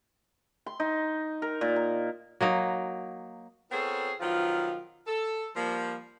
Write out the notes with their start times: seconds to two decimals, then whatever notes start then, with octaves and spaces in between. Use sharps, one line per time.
0.66 C6
0.80 D#4
1.42 A#4
1.61 A#2
1.76 A#5
2.41 F#3 A#3 D#4
3.71 B3 C4 F4 G#4 A4 C#5
4.20 B2 D#3 F3 F#3 F4
5.07 A4
5.56 F3 G3 A#3